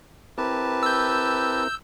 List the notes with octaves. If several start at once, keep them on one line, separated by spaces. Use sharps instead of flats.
C4 E4 G4 A#4 B4 A5
E6 G6